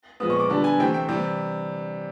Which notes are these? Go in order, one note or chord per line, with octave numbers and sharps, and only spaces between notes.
A#2 F3 G#3 B3 D#6
C#6
D6
D3 G3 B3 A5
G#5
C3 E3 A3 C4 G5
G5
C3 E3 G3